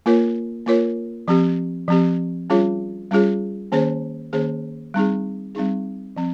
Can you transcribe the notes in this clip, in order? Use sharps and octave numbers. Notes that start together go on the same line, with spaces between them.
A#3 F4 A#4 C#5
A#3 F4 A#4 C#5
F3 C4 G4
F3 C4 G4
G3 C#4 F4 G#4 C#5
G3 C#4 F4 G#4 C#5
D#3 A#3 C#4 G#4 C5
D#3 A#3 C#4 G#4 C5
G3 C4 D#4 G#4
G3 C4 D#4 G#4
F3 C4